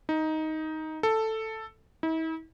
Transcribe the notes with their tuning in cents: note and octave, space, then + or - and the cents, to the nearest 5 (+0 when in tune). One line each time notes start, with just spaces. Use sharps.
D#4 +10
A4 +5
E4 -45